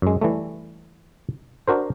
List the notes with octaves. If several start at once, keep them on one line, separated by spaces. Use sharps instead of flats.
F#2 G#3
E3 G3 A3
D4 F#4 A#4 C5